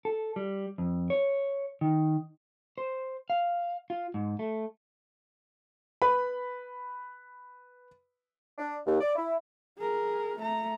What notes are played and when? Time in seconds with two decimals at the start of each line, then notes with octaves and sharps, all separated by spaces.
0.05 A4
0.36 G3
0.78 F2
1.10 C#5
1.81 D#3
2.78 C5
3.30 F5
3.90 F4
4.14 G#2
4.39 A3
6.02 B4 B5
8.58 D4
8.86 D#2
9.00 D5
9.16 E4
9.78 G#4 A#4
10.39 A3 A#5